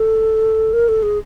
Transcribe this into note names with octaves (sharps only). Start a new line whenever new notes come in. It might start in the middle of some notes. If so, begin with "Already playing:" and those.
Already playing: A4
A#4
A4
G#4